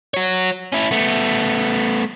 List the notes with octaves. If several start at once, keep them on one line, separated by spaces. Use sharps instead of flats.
F#4 C#5
C#4 E4
A3 B3